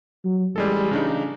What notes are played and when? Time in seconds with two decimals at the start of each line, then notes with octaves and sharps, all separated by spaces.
0.24 F#3
0.56 A1 G3 G#3 A4
0.91 C#3 D4 D#4